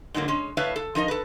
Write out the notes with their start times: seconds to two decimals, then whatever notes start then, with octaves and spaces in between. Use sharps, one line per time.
0.14 G#2 D3 F#3 G#3 A#3
0.28 G#3 C#4
0.57 A2 B4 C#5 E5 F5 A5
0.76 A4
0.95 F3 D#4 A#4 D#5
1.08 A4 B4